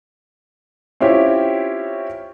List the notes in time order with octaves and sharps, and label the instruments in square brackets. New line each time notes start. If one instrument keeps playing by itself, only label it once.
[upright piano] C4 C#4 E4 F4 G4 C#5